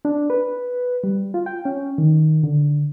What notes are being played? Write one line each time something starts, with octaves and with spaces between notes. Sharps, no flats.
D4
B4
G3
F4
G5
C#4
D#3
D3